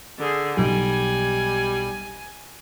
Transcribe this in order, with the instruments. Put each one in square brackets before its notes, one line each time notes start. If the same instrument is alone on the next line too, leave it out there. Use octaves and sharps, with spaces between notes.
[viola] D3 G#4
[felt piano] B1 [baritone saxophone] G3 [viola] G#5